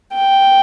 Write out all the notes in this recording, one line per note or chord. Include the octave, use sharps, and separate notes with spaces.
G5